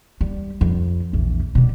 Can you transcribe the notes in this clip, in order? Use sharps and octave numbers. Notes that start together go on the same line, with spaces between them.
G3
F2
A#1 E2
B2 G3